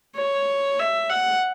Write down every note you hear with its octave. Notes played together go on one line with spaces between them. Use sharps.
C#5
E5
F#5